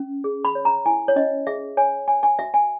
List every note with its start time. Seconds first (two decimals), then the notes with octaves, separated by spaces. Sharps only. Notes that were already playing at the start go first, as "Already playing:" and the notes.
Already playing: C#4
0.24 G#4
0.45 B5
0.55 C#5
0.65 A#5
0.86 E4 G#5
1.08 C#5
1.16 C#4 D#5
1.47 G#4 E5
1.77 C#5 G#5
2.08 C#5 G#5
2.23 G#5
2.39 F#4 E5
2.54 G#5